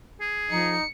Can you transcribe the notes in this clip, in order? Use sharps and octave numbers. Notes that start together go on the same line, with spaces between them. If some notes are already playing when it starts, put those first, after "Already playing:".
G#4
F3 D#4 C#7